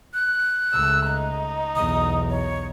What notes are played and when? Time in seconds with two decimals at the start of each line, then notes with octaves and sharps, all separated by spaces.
0.14 F#6
0.74 C#2 A3 E6
1.08 D#4
1.76 B1 E2 D#6
2.30 C#5